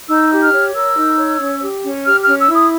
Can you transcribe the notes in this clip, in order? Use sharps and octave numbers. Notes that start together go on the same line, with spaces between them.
D#4 E6
G4
F6
C#5
A#4 E6
D#4
C#5
C#4
G4
C#4
G4 F6
F6
C#4
E6
E4 D#6